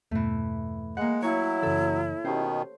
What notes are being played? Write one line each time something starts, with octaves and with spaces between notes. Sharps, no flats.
E2 G2 B2 E3 A3
G#3 A#3 F#5
F#3 E4 C#5 F5 G#5 A#5
F#2 C#3 E3 A4
B2 D#3 C#4 G4 C5